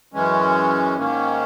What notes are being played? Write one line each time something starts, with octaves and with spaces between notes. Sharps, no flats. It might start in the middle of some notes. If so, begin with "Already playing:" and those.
F#2 E3 G#3 C#4
G#2 D#3 A#3 C#4